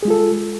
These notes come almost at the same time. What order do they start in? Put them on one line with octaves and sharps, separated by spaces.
G#4 G#3 F4 A4